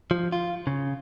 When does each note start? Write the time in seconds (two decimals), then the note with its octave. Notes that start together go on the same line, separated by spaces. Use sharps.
0.11 F3
0.32 F4
0.67 C#3